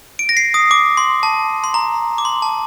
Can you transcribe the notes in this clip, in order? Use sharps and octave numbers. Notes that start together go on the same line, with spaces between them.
D7
A#6
C7
D#6
D6
C6
A5
C6
A#5
D6
C6
A5